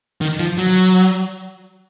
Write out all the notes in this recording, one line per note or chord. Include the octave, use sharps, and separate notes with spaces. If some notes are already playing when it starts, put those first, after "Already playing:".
D#3
F3
F#3